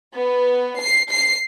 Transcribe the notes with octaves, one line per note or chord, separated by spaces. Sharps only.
B3
C7
C7